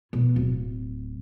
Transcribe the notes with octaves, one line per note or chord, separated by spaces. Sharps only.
B2
D1